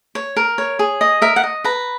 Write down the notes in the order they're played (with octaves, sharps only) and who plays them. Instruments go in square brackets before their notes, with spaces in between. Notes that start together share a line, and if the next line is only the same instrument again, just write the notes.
[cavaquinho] C#5
A#4
C#5
G#4
D#5
A#4 E5
F#5
D#5
B4 A#5